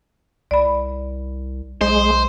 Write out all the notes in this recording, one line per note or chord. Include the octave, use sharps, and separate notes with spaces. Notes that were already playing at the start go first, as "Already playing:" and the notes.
C2 D5 B5
B1 G#3 C5